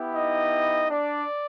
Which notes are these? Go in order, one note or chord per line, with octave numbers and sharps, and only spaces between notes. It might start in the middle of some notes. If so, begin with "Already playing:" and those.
Already playing: B3 E4 G4
D#4 D#5
D4 D5